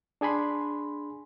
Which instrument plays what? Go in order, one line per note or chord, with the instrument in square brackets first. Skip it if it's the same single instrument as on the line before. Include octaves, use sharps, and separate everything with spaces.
[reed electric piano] D4 G#4 G#5 B5 C6